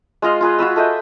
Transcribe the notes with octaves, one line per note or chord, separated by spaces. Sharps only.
G#3 F4 D#5 F5
F4 G#4 B4
F4 F#4 B4 E6
A4 D#5 E5 G5